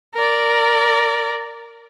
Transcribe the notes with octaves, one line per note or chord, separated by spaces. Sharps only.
A#4 D5